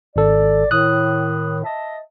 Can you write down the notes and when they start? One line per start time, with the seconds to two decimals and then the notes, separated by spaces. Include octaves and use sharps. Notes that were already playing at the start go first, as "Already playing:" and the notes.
0.16 G#1 A4 D5
0.71 A2 D#3 D#6 F#6
1.64 D#5 E5 A5